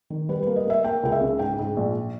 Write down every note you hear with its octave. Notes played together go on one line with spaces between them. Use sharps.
D#3
G3 B4
A#3 B4
D#5
A#3 E5
A#3 G5
C#2 G5
E5
C#3
G#2 G5
G#2
A#1